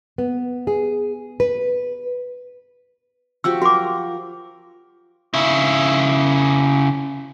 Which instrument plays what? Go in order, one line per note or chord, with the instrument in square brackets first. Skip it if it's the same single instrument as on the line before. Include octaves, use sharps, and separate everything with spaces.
[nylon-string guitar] B3
G#4
B4
[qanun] F3 F#4 G4 [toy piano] E6
[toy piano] F#4 D6 [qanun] A#4
[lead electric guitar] C#3 E4